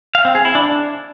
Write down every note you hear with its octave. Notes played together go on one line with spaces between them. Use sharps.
F5
C4
G#4
E4
D4